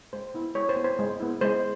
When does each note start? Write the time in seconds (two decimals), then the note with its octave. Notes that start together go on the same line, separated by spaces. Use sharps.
0.13 G#3 C5
0.34 B3 E4
0.55 G#3 C#5
0.69 C5
0.76 B3 E4
0.84 C5
0.99 G#3
1.20 B3 E4
1.41 G#3 C5